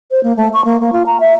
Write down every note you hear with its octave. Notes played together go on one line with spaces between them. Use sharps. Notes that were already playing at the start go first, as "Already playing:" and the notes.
C5
A#3
A3
C#6
A#3
A#3
F4
A#5
E5